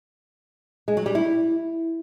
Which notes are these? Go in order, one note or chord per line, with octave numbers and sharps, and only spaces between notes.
G#3
F#3
G3
E4